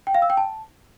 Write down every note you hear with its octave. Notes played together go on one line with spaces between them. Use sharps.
G5
F5
E6
G5
A5